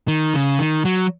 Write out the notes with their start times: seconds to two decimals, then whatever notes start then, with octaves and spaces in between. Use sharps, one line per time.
0.08 D#3
0.34 C#3
0.59 D#3
0.85 F#3